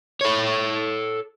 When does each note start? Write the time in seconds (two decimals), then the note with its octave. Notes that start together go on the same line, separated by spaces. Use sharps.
0.21 A4 C#5